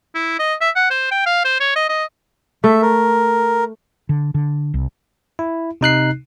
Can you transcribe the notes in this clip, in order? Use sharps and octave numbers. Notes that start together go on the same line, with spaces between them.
E4
D#5
E5
F#5
C5
G5
F5
C5
C#5
D#5
D#5
A3 E5
A#4
D3
D3
C2
E4
C3 D#4 F#6 C7